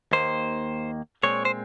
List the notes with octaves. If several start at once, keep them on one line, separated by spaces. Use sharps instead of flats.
D#2 D#3 A#3 C5
A#2 G#3 C4 C#5
C5